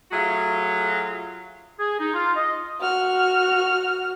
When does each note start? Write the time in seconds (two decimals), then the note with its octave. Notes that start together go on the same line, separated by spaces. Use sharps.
0.11 F#3 A3 F4 F#4 G#4
1.79 G#4
1.99 D#4
2.14 F4
2.36 D#5
2.80 F#4 F6